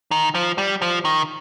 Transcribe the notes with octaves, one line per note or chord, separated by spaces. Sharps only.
D#3
F3
G3
F3
D#3